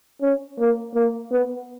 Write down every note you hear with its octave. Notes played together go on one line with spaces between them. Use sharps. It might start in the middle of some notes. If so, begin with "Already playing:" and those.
C#4
A#3
A#3
B3